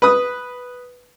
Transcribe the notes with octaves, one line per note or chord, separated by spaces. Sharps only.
B4 D#6